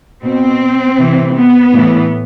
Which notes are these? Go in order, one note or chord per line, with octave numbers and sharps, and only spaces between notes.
B2 C4
C3 E3
B3
A2 E3